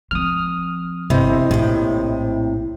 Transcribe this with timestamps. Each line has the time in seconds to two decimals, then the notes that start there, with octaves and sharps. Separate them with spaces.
0.11 F3 C4 D#6 F6
1.10 G1 C3 E4 C5 D#5
1.51 A#1 A2 C3